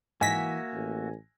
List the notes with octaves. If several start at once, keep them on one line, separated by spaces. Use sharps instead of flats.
G#2 E3 A#3 F#4 E5 G#5 A#6 B6
A1